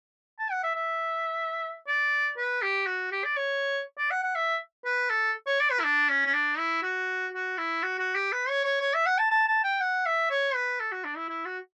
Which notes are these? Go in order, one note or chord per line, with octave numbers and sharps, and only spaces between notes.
A5
F#5
E5
E5
D5
B4
G4
F#4
G4
D5
C#5
D5
F#5
F#5
E5
B4
A4
C#5
D5
B4
E4
D4
C#4
C#4
D4
E4
F#4
F#4
E4
F#4
F#4
G4
B4
C#5
C#5
C#5
E5
F#5
A5
A5
A5
G5
F#5
E5
C#5
B4
A4
F#4
D4
E4
E4
F#4